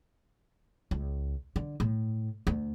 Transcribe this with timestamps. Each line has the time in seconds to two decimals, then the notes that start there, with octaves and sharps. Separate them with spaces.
0.91 C#2
1.56 D3
1.80 A2
2.47 D2